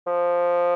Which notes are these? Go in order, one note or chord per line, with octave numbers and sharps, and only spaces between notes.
F3